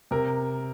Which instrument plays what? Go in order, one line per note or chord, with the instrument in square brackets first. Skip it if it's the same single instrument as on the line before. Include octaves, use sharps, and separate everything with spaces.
[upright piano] C3 A#4